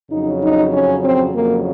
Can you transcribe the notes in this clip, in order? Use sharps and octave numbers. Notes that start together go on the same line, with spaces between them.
F2 C#3 F#3 D#4
D#4
C#4
C4
F2 C#3 F#3 A#3